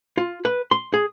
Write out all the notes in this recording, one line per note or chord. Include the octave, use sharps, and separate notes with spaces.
F4
B4
C6
G#4